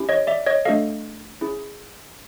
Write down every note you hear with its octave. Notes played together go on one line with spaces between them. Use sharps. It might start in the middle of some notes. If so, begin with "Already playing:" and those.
Already playing: C#4 E4 G4
C#5 D#5
D5 E5
C#5 D#5
A3 D4 F#4 A4 D#5 F5
C#4 E4 G#4